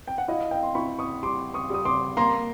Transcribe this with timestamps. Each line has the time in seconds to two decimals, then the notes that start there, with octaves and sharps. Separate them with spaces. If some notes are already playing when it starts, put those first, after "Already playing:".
0.08 G5
0.18 F#5
0.28 E4 D#5 F5
0.51 F5 G5
0.63 C6
0.75 E4 B5 C#6
0.99 C#6 D#6
1.23 G3 C6 D6
1.54 C#6 D#6
1.70 G3 D#6
1.85 C6 D6
2.17 A#3 A#5 C6